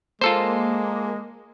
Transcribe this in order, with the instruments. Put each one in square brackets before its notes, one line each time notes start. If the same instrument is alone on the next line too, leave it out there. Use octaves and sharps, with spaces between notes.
[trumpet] G#3 [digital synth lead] A#3 [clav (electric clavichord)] F4 A4 C5